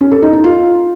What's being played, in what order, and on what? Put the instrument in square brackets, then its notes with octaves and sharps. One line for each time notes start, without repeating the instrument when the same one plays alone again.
[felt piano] C#4
A4
D#4
D#4
F4